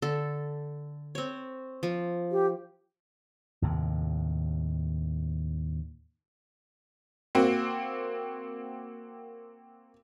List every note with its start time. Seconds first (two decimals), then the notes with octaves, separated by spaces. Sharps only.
0.02 D3 A4
1.15 C4 C#5
1.83 F3
2.32 G4
3.62 D#2 A2 C3
7.35 A#3 C4 F#4